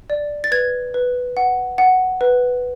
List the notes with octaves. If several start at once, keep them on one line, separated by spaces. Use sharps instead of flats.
D5
A6
B4 G#6
B4
F#5
F#5
B4